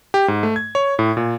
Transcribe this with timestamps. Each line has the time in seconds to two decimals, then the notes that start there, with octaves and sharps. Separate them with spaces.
0.14 G4
0.28 G#2
0.43 A3
0.56 G#6
0.75 C#5
0.99 A2
1.17 A#2